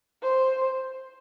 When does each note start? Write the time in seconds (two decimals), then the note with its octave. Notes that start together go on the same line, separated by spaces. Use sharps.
0.22 C5